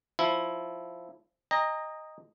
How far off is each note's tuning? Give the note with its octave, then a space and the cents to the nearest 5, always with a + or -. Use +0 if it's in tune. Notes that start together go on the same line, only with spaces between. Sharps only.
F3 +0 E4 +0
D#5 +0 G5 +45 A#5 -5